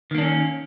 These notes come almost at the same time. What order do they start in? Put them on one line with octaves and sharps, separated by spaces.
D#3 A#3 D4 C#4